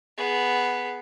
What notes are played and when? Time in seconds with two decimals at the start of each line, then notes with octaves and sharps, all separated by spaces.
0.18 B3 G#4